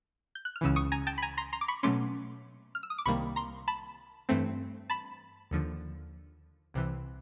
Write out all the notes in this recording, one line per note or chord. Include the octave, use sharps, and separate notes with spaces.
G6
F#6
F6
C#2 C#3 E3 E6
C#6 D#6
G#5 A#5
G5 A5
B5
G#5 A#5
A#5 C6
A#5 C6
D6
B5 C#6
B2 F#3 A3 C#4 C6 D6
F6
E6
D#6
D6
C2 C3 D#3 G3 A#3 B5 C#6
A#5 C6
A5 B5
G2 E3 A3 C4
A5 B5
D#2 D3 F3
C2 C3 E3